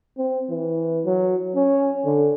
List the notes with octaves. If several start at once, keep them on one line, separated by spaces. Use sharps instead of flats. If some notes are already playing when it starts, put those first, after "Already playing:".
C4
E3
F#3
C#4
D3